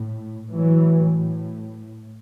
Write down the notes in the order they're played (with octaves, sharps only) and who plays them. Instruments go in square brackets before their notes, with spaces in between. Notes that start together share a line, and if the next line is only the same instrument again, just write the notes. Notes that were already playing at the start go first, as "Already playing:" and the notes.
Already playing: [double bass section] A2
A2 E3 F#3